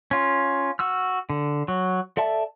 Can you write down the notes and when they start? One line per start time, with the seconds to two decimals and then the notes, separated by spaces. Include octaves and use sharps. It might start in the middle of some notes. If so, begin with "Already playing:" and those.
0.11 C#4 F4
0.79 F#4 E6 F6
1.30 D3
1.68 F#3
2.17 A4 D5 E5 A5